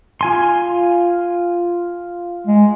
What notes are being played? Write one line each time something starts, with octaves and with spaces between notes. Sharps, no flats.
F4 G#5 C6
G#3